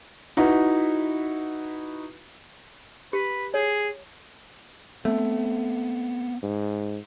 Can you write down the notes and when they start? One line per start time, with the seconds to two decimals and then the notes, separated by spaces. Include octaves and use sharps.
0.37 D#4 E4 F#4 B4
3.13 G4 B4
3.54 G#4 C#5
5.05 A3 B3 C4
6.43 G#2